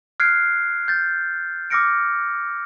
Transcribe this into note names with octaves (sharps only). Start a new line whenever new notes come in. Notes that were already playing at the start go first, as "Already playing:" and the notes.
F6 F#6 G#6 C7 D7
G6 A6
D6 E6 F6 A#6 C#7 D7